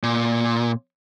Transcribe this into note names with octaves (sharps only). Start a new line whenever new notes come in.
A#2